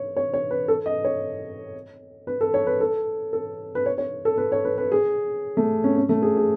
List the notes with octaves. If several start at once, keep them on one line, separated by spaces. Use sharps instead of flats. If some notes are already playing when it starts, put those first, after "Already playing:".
Already playing: C#5
C#5
C#5
B4
A4
D#5
C#5
B4
A4
C#5
B4
A4
A4
B4
C#5
C#5
A4
B4
C#5
B4
B4
G#4
A3
C#4
C#4
A3
G#4
G#4